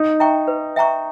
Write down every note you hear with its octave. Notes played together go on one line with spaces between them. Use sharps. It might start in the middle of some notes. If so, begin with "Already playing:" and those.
Already playing: D#4
E5 G5 A#5 C#6
B4
E5 G5 A#5 C#6